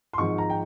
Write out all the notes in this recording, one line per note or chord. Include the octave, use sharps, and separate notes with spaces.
C6
G#1 G#2 F3 G#3 C#6
A#5
G5